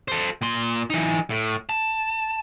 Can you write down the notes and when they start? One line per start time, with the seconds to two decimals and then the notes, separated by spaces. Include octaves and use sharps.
0.08 A4 C5
0.42 A#2 C6
0.90 E3 D#4
1.30 A2
1.69 A5